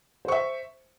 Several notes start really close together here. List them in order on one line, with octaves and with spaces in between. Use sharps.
C5 C#6 E5